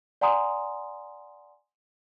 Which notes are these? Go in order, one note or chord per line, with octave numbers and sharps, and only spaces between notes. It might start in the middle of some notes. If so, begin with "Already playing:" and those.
D5 F#5 G#5 A#5 C6 D#6